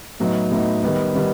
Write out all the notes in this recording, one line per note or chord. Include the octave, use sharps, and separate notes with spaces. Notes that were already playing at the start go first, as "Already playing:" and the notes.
A2 F#3 B3 D#4
A2 F#3 B3 D#4
D#3 G3 B3 D#4
D#3 G3 B3 D#4